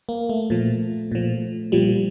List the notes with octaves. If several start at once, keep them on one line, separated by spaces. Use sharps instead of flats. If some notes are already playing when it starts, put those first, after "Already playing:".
A#3
A3
A#2 F3
A#2 F3
A#2 F3 G3